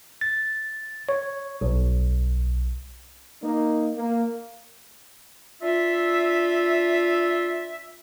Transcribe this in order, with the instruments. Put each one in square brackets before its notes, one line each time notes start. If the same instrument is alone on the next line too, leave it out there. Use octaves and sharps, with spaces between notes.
[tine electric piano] A6
C#5
B1
[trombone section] A#3 D#4
A#3
[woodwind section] D4 F4 E5